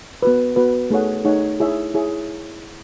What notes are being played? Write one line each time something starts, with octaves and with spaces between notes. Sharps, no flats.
B3 F#4 B4
B3 F#4 B4
A3 D#4 G#4 C#5 F#5
A3 D#4 G#4 C#5 F#5
E4 G#4 C#5 E5
E4 G#4 C#5 E5